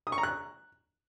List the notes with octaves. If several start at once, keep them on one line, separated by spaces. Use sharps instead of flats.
D#6
C#6
A#5
F#6